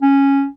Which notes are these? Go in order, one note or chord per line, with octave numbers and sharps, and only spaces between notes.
C#4